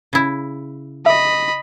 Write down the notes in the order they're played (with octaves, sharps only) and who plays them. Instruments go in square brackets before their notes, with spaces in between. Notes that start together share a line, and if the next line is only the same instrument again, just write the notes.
[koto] C#3 E4
[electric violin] D#5 B5 [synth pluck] E5